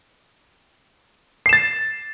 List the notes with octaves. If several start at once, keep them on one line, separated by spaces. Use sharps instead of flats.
A6 C7 E7